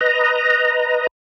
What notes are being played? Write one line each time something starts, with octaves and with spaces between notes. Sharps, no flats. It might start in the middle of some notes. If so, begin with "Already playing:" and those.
B4 D#5 A#5